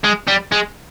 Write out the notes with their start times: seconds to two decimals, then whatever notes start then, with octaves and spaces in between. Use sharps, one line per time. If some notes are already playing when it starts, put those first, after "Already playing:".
0.04 G#3
0.27 G3
0.52 G#3